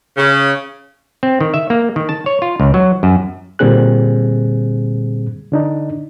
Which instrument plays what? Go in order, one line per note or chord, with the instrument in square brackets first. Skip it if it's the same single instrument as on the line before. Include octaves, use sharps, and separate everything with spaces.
[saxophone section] C#3
[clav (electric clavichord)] C4
D#3
E5
A#3
D#3
A5
C#5
F4
C#2
F#3
F#2
[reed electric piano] A#2 D3 G3 C4 G#4 F#6
D3 D4 D#4